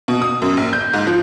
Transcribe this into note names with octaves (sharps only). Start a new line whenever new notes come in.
B2
D#6
F#2
A#1
G6
G#2
F3